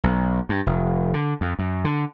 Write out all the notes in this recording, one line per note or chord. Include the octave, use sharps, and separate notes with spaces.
B1
G2
F1
D3
F2
F#2
D3